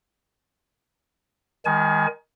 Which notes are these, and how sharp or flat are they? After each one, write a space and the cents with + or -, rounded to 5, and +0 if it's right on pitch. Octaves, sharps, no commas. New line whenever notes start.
D#3 +15 G#3 -35 G#5 +35